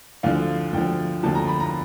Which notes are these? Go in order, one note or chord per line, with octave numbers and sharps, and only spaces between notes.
D2 D3 F3 F5
D2 D3 F3 G5
D2 D3 F3 A5
A#5
B5
A#5